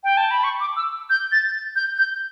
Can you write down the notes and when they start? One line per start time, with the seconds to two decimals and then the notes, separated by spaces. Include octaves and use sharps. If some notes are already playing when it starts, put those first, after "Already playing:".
0.04 G5
0.17 A5
0.31 B5
0.44 C#6
0.60 D6
0.76 E6
1.10 G6
1.32 A6
1.76 G6
1.98 G6